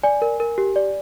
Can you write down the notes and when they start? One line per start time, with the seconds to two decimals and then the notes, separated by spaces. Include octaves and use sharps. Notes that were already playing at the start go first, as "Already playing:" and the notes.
0.03 D5 G#5
0.22 A#4
0.40 A#4
0.58 G4
0.76 D5